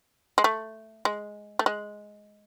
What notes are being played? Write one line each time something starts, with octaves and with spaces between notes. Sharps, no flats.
G#3
A3
G#3
A3
G#3